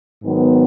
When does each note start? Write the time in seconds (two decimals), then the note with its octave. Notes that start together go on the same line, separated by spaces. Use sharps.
0.22 G#2 D#3 F#3 B3